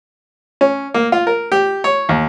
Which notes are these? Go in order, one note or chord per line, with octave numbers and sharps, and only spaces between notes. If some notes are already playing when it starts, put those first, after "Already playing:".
C#4
A#3
F4
A#4
G4
C#5
D#2